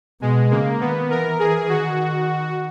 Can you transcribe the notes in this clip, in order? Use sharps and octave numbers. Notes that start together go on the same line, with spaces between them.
B2 G#3
C#3 A#3
D#3 B3
E3 A#4
G#4
D#3 F#4